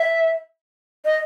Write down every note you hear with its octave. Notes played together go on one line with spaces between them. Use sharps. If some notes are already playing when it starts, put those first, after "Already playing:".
Already playing: E5
D#5